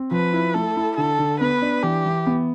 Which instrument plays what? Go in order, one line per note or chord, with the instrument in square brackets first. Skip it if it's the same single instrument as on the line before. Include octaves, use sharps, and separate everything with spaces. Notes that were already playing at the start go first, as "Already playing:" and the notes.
Already playing: [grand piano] C4
[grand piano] F3 [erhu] B4
[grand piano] E4
[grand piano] A3 [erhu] A4
[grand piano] E4
[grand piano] D3 [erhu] A4
[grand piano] D3
[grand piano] B3 [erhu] B4
[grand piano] D4
[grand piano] E3 [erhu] G4
[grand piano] E3
B3